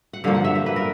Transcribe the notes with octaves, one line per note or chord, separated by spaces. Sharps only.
F#5
G2 D3 F3 A#3 F5
F#5
E5
E5
B4
A#4